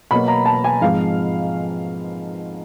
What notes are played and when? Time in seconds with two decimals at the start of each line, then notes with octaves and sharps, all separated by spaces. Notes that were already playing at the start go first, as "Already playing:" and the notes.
0.11 B2 F#3 A#3 B5
0.28 A#5
0.45 A5
0.64 G#5
0.81 G#2 F3 G#3 C4 F5